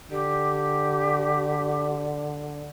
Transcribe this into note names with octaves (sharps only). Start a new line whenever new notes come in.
D3 G4